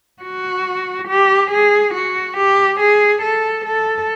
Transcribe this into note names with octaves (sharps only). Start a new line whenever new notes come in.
F#4
G4
G#4
F#4
G4
G#4
A4
A4